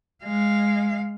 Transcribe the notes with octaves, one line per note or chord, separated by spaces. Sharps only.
G#3 F5